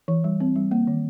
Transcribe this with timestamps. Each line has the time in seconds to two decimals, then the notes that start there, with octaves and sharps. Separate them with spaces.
0.08 E3
0.24 G3
0.40 C4
0.56 G3
0.71 A#3
0.87 D#3